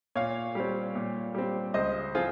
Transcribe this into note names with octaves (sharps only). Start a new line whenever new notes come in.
A#2 C#5 F5
G3 C4
A#2
G3 C4
C#2 C5 D#5
F3 C4 F4 G#4